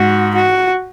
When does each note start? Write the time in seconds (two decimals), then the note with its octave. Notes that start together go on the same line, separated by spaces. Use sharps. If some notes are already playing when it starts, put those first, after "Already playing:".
Already playing: G#2 F#4
0.35 F#4